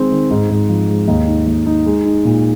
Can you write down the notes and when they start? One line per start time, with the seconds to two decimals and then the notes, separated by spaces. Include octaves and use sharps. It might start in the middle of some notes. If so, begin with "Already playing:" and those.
Already playing: D#3 G#3 C4
0.11 D#3
0.31 G#2
0.50 G#2
0.69 F3
0.88 G#3
1.08 D#2
1.27 D#4
1.47 D#2
1.66 D#4
1.86 G#3
2.05 D#4
2.25 A#2